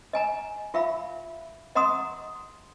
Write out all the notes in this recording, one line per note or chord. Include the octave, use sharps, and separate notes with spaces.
D#5 G#5 A#5
F4 E5 F5 B5
D#5 F#5 A#5 C6 D#6